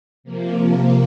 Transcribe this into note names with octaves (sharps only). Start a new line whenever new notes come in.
C3 F3 A#3
A#3